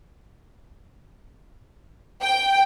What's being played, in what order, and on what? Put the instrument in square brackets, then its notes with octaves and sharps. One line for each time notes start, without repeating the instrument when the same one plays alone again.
[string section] G5